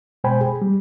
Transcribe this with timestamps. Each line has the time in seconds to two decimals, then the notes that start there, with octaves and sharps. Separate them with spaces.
0.24 B2 G#3 C5 G5 G#5 B5
0.41 G#4
0.62 G3